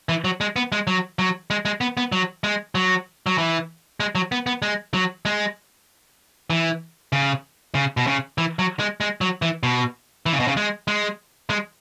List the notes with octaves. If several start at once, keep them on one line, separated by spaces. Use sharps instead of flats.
E3
F#3
G#3
B3
G#3
F#3
F#3
G#3
G#3
B3
B3
F#3
G#3
F#3
F#3
E3
G#3
F#3
B3
B3
G#3
F#3
G#3
E3
C#3
C#3
B2
C#3
E3
F#3
G#3
G#3
F#3
E3
B2
E3
C#3
B2
C#3
G#3
G#3
G#3